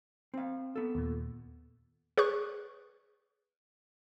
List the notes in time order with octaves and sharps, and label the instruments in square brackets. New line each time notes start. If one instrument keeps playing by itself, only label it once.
[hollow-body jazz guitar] C4 F5
B3 A4
[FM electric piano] D#2 A#2
[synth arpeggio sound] G#4 B4 C#5 C#6 F#6